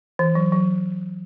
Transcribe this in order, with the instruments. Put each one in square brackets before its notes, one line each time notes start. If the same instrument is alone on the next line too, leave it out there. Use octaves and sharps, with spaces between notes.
[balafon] E3
F#3
F#3